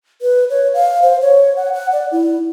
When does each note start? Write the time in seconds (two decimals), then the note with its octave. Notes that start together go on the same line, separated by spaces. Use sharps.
0.22 B4
0.50 C#5
0.74 F5
1.02 C5
1.22 C#5
1.56 F#5
1.74 F#5
1.92 D5
2.12 E4